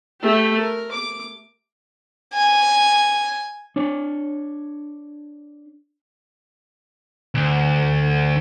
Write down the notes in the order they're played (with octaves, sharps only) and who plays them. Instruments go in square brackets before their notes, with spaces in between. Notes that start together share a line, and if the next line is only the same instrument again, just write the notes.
[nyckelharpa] A3 G4
A#4
D6
[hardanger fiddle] G#5
[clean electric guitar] D4 C#5
[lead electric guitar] D2